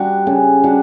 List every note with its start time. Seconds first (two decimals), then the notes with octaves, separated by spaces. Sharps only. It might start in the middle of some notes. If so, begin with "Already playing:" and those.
Already playing: G3 D4 F#4
0.27 C#3
0.64 G3 D4 F#4